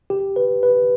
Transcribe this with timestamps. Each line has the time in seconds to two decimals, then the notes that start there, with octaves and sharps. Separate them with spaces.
0.10 G4
0.36 B4
0.63 B4